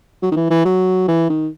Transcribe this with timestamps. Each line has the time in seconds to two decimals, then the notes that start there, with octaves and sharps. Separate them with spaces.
0.22 F#3
0.32 D#3
0.36 E3
0.50 E3
0.65 F#3
1.08 E3
1.30 D#3